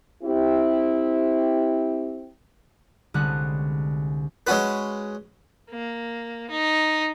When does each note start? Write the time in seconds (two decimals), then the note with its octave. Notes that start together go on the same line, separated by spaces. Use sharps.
0.24 C4 E4 G4
3.14 C2 D3 G#3 B3 C#4 F#6
4.47 G#3 C#4 F#4 B4
5.70 A#3
6.50 D#4